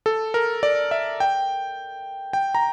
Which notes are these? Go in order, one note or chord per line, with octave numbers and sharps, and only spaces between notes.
A4
A#4
D5
E5
G5
G5
A#5